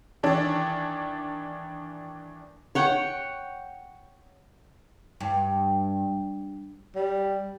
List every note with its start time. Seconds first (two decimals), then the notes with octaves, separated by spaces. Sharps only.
0.23 D#3 E3 D4
2.75 C#5 F#5 G5
5.21 G2
6.96 G3